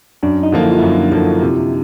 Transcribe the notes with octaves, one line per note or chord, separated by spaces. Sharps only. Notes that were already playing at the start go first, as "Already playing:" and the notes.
F#2 D4
D#4
D3 F3 A#3
E4
F4
F#2 E4
D3 F3 A#3
C3